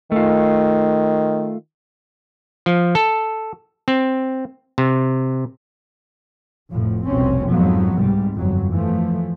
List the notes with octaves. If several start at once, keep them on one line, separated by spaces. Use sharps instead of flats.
D#3 A3 F4
F3
A4
C4
C3
F1 F2 A2 F3
F1 C2 F2 B2 C4 C#4
F2 G#2 F3 F#3 G#3 B3
C2 G#2 C3 G3
G1 F2 F#3
E3 F3 A3